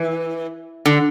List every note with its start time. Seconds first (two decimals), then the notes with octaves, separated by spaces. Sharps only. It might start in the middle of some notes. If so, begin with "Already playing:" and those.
Already playing: E3
0.86 D3